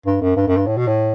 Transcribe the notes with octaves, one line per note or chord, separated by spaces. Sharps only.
G2
F#2
G2
F#2
G2
A2
B2
A2